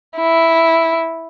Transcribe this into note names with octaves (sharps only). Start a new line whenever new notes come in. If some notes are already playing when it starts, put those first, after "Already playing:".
E4